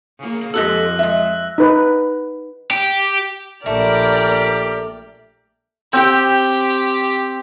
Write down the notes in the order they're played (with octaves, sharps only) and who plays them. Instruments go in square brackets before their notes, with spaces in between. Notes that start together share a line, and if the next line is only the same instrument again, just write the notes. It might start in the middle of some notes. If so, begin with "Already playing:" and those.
[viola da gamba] C#3 A#3
[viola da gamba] F2 [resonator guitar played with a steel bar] G#3 G4 A4 [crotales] E6 F#6 A#6
[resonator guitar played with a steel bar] G#3 E5
[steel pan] D#4 B4
[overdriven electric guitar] G4
[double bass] A#1 [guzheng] A3 [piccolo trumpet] G4 [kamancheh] A#4 D5
[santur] C4 G5 [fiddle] G4